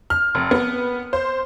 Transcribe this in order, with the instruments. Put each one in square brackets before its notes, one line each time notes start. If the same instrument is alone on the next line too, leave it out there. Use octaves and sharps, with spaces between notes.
[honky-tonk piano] F6
F1
B3
C5